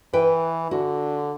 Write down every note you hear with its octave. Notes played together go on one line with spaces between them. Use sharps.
E3 B4 G5
D3 F#4